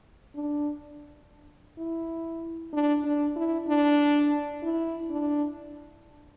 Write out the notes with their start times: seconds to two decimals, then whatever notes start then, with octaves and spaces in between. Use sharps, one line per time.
0.35 D4
1.78 E4
2.73 D4
3.04 D4
3.36 E4
3.68 D4
4.63 E4
5.11 D4